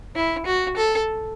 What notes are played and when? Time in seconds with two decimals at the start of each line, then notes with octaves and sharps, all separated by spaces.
0.15 E4
0.46 F#4
0.76 A4